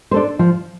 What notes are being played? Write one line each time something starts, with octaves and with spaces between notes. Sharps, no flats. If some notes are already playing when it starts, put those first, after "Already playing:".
D4 A4 C5
F3